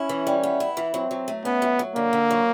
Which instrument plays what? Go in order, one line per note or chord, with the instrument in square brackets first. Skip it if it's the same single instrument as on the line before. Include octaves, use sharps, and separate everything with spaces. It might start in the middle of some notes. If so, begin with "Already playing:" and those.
Already playing: [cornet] C#4 [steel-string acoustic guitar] E4
[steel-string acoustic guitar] E3
G3
B3
E4
E3
[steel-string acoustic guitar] F#3 [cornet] C4
[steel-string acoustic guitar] F#3
A3
[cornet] B3 [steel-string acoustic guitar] C#4
[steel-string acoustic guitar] F#3
F#3
[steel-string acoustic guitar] D3 [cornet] A#3
[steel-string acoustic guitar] D3
F#3